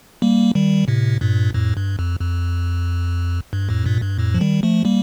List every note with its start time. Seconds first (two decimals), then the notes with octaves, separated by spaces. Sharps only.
0.22 G3 A#3
0.55 D#3 G3
0.88 A2 C3
1.21 G2 A#2
1.54 F2 A2
1.77 G2
1.99 F2
2.20 F2
3.53 G2
3.69 F2 A2
3.86 G2 A#2
4.02 G2
4.18 F2 A2
4.34 F3
4.41 D#3 G3
4.63 F3 A3
4.85 G3 A#3